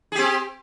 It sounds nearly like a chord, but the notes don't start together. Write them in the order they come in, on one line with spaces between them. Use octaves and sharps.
G#4 G4 C4